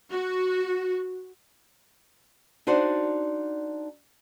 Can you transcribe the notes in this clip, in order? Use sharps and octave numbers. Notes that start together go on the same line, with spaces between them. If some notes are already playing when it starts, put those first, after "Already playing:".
F#4
D4 D#4 F#4 C5 D5 F#5